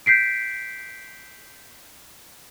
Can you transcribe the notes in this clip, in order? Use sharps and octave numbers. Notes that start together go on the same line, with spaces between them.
G6 B6 C7 D7